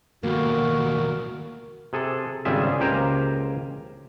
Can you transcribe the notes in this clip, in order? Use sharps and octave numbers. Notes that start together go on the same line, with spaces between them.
D#2 B2 A#3 F#4 A#4
C3 G#4 A4
G#1 C#3 G3 F4 G#4 E5
C#2 A#3 G4 C5 G#5 A#5